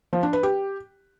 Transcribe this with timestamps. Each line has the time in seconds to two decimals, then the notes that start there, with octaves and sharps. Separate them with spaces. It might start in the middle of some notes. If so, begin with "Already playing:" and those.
0.13 F3
0.23 D4
0.33 B4
0.43 G4